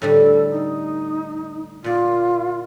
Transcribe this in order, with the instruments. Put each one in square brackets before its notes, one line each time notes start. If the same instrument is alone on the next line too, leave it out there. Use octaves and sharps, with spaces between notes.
[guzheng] A2 D3 G3 [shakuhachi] A4
[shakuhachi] D#4
[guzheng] A#2 D5 [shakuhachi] F4